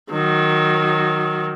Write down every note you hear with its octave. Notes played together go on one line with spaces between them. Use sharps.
D#3 F#3